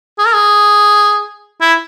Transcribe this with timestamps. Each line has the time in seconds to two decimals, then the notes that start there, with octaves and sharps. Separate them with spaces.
0.19 G#4
0.27 A#4
0.34 G#4
1.61 E4